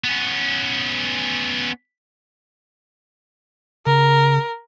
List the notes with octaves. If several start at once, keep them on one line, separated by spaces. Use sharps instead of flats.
B3 C#4
C#3 A#4